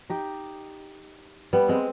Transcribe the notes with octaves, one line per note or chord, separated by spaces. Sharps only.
D#4 G4
G3 B3
G#3 C4